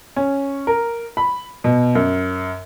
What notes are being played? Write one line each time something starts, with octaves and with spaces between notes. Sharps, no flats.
C#4
A#4
B5
B2
F#2